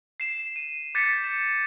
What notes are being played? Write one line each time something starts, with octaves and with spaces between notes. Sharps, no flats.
C7 E7
D#7
D6 G6 A6 B6 C#7
E7